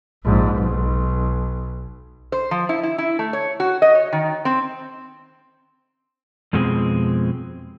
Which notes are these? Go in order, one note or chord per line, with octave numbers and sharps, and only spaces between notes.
A#1 G#2
B1
C5
F3
E4
E4
E4
A3
C#5
F#4
D#5
C#5
D#3
C4
F2 B2 F3 G#3 B3 C4